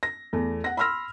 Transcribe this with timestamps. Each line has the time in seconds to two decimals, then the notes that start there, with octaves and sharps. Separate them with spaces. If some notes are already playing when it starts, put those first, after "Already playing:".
0.03 A#6
0.33 E2 A3
0.64 F#5 A#6
0.77 B5 C6 E6 F6 A#6